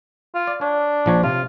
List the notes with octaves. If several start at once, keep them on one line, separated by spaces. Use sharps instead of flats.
F4
D5
D4 C#5
A#1 F3 C#5
C3 F4